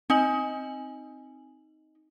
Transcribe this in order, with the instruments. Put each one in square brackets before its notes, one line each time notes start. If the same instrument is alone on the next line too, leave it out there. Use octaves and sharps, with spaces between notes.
[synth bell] C4 G#5 F#7 [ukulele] D#4